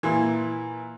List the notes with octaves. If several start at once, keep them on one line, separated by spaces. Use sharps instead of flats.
A#2 E3